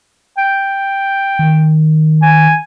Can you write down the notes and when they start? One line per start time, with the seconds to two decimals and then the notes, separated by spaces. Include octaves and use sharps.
0.38 G5
1.39 D#3
2.22 G#5